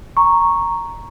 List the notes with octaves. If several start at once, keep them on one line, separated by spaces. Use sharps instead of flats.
A#5 C#6